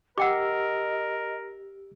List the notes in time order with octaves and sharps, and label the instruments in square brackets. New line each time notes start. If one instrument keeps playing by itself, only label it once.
[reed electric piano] G4 E6 [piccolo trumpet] A#4 [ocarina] D#5 [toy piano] F#5 G5 D6